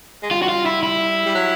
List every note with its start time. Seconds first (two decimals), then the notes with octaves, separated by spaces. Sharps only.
0.23 G#3
0.31 G3 F4
0.42 F#4
0.49 F4
0.66 E4
0.83 E4
1.26 G3
1.35 F#3